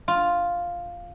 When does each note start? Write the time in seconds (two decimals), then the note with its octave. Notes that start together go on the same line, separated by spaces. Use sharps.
0.08 F4